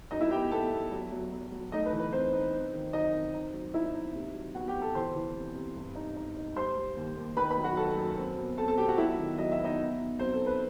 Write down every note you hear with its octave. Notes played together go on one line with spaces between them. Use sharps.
F#2 D#4 D#5
E4 E5
B3 G4 G5
B3 A4 A5
B3
F#3
F#3
F#3
F#3
A3 D#4 D#5
B4
E3
B4
C4 D#4 C5
D#4
C4
D#3
F#2 D#4 D#5
C4
D#4
F#3
D#4 E4 E5
D#4
C3
F#3
B3 F#4 F#5
G4 G5
B3
A4 A5
E3 C5 C6
E3
C3
C3
G2
D#4
D#4
D#4
G3 C5 C6
G3
D#2
D#2
D#3 B4 B5
B4 B5
F#3
F#4 F#5
F#3 A4 A5
F#2
C4
B2
C4 A4 A5
A4 A5
B2 G4 G5
F#4 F#5
F#3 E4 E5
D#3
F#3 D#5
E5
B3
D#4 D#5
B3
D#4
F#3 C4 C5
A4
D#4
B4